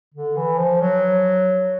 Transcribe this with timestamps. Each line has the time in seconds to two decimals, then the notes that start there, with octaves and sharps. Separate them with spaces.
0.14 D3
0.36 E3
0.58 F3
0.81 F#3